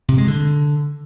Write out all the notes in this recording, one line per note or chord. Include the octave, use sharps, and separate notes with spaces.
C3
G#3
D3